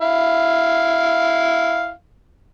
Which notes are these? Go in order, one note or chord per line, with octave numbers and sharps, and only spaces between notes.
E4 F5